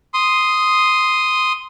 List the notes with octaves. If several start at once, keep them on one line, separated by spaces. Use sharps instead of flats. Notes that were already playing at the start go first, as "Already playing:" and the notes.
C6 D#6